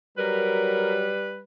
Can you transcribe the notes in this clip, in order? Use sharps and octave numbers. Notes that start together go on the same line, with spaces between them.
F#3 G3 A#4 B4